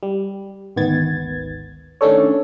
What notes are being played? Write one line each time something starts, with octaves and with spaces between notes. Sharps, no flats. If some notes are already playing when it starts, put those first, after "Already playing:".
G3
G#1 D2 D#3 B3 G#6 A6
D#3 A3 C#4 D4 A4 C#5